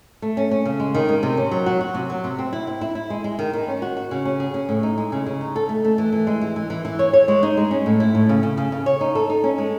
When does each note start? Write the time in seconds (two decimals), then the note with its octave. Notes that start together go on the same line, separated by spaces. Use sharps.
0.22 A3
0.37 C#4
0.51 C#4
0.65 C#3
0.80 G#3
0.95 D#3
1.09 G#3
1.23 C3
1.37 C#4
1.51 F#3
1.66 F#4
1.81 F#4
1.94 C3
2.10 F#3
2.24 C3
2.39 C4
2.53 E4
2.67 E4
2.81 E4
2.95 E4
3.10 G#3
3.24 G#3
3.39 D#3
3.53 D#3
3.68 C#4
3.82 F#4
3.97 F#4
4.11 C#3
4.25 C#4
4.40 G#4
4.54 C#4
4.69 A2
4.83 D#4
4.98 G#3
5.12 C#3
5.26 C#3
5.41 D#4
5.56 A4
5.69 A3
5.85 A3
5.98 E3
6.12 E3
6.27 G#3
6.42 E3
6.56 E3
6.70 E3
6.85 E3
6.99 C#5
7.13 C#5
7.28 G#3
7.43 D#4
7.57 G#3
7.71 C#4
7.86 A2
8.00 E4
8.15 A2
8.29 C#3
8.43 C#3
8.58 C#3
8.72 C#3
8.86 C#5
9.01 D#4
9.15 A4
9.30 D#4
9.44 C#4
9.58 G#3